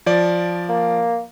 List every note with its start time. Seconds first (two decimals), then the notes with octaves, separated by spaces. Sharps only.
0.06 F3 D5
0.69 A#3